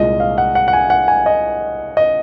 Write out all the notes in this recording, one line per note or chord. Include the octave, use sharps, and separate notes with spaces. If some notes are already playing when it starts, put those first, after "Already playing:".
Already playing: C2 A#2 G#3 D#5
F5
F#5
F#5
F#5
G#5
F#5
G#5
D#5
D#5